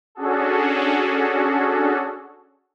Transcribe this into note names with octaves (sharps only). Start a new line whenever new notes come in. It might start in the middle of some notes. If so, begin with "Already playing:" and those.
C#4 D4 F#4 G#4 A4